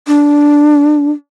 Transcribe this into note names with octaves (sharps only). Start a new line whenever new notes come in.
D4